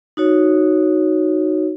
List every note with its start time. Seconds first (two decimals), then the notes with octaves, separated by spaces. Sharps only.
0.17 D#4 F#4 C#5